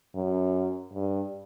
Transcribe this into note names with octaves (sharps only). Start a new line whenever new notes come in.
F#2
G2